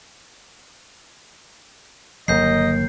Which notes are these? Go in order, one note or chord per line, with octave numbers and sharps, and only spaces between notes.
G1 D#2 F#3 A#3 A#4 D#5 G6 C7